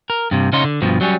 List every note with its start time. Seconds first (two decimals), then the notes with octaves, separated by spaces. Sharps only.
0.10 A#4
0.31 G2 C3
0.53 C#3 C#4 D#4 C#5 C6
0.64 D3
0.82 G2 B2 F3
1.01 F#3 G3 C#4